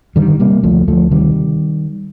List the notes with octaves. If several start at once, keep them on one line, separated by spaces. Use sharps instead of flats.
D3 D#3 G3
C3 G3 A#3
D2 F3 A3
D2 F3 A3
C3 D#3 G3